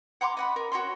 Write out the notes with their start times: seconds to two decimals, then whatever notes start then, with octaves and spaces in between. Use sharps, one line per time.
0.21 F#5 A#5 C6 D6
0.37 D#5 F#5 B5
0.56 A#4
0.72 F#4 C#5 A#5 C6